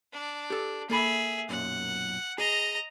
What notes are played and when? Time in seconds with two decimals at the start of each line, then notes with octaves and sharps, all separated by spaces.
0.13 D4
0.50 G4 A4
0.90 A#3 G#4 A4 E5 B5
1.49 B1 F#2 A#2 F#5
2.38 G#4 D#5 A#5